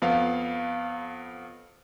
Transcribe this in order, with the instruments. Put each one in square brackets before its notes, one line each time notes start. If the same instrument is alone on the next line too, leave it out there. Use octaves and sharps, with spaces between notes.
[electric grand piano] F2 B3 F5